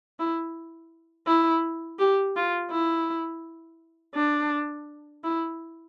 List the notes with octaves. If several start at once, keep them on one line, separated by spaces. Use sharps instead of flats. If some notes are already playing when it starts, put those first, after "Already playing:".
E4
E4
G4
F4
E4
D4
E4